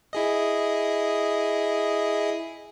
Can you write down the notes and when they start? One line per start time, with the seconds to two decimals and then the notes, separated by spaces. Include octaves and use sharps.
0.13 E4 G#4 D#5